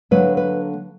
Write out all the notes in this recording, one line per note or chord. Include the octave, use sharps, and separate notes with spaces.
D3 F#3 A#3 B4
B4